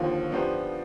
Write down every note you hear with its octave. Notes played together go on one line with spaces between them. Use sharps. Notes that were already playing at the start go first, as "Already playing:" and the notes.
Already playing: D#2 D3 F3 D#4 F4 F5
F3 B3 D4 G4 C5